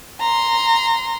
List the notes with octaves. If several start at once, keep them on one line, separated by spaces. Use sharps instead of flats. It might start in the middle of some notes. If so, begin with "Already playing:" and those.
A#5 C6